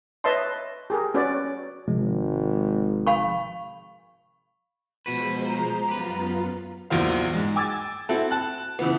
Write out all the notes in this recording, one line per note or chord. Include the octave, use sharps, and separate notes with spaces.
B4 C#5 D#5 E5 A5 C6
G4 G#4 A#4
C#4 F#4 B4 C#5 D5
G#1 C3 F3 G#3
F5 B5 C#6
B2 F3 G#3 F#4 B4 C5
A#5
F#2 B3 F4 G4 B4
A#1 E2 A#2 F#3 C5 F5
G#2 G#3
G5 G#5 D6 E6 G#6 A6
C4 E4 F#4 A4
A5 F#6
C#3 E3 F3 B3